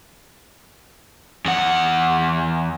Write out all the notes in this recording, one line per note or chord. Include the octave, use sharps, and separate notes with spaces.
E2 F#5